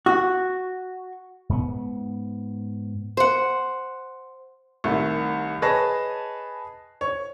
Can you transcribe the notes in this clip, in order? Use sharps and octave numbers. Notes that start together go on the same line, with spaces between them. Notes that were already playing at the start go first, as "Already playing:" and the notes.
F#4
G#2 B3
C5 F#5
C2 D#3 A3
G#4 B4 C#5 D#5 A5 A#6
C#5 C#6